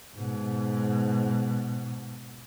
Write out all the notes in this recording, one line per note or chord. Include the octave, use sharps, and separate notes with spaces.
G#2 B2